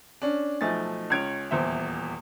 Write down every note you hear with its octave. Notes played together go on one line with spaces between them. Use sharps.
C#4 D4
B1 F3 A3 D#4 G#5 A6
C#2 C#4 G#6 D7 F7
D#1 E2 C5 E5